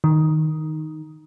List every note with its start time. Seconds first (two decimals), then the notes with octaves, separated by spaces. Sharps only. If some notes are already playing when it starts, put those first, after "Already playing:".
0.04 D#3